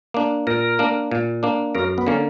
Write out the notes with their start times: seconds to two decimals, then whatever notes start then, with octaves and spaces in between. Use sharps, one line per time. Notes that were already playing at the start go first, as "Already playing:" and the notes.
0.14 A#3 D4
0.47 A#2 A#4
0.79 A#3 D4
1.11 A#2
1.43 A#3 D4
1.75 F#2 A#4
1.98 B3
2.07 D3 A#3 C#4